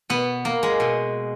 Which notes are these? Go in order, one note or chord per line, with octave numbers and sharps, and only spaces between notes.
B2 B3
A#3
G#3
B2